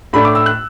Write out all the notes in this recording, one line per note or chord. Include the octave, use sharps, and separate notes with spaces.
A2 A3 D4 B5
D6
E6
F#6